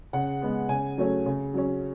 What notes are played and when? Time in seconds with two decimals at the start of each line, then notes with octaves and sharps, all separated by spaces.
0.13 C#3 F#5
0.42 G#3 B3
0.69 C#3 G#5
0.98 F#3 A3 C#4
1.26 C#3
1.54 F#3 C#4